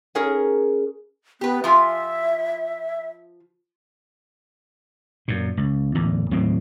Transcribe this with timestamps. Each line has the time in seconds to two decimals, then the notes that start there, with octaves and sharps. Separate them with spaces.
0.15 C#4 G#4 A#4 C#5
1.41 B3 G4 B4
1.64 F3 F4 E5 G#5
5.28 F#2 A#2
5.57 C#2
5.95 D1 E2
6.31 D#2 A2 F#3 C4